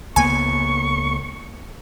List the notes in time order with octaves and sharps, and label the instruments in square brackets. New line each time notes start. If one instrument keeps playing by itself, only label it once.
[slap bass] C#2 A#3 B3 [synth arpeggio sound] G#5 [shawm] C#6